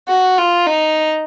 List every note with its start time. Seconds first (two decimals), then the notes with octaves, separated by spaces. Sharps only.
0.08 F#4
0.38 F4
0.66 D#4